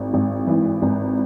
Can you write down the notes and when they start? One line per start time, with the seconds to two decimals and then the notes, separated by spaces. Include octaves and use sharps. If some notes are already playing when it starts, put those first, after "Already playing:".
Already playing: G#1
0.13 G#1
0.47 E3
0.82 G#1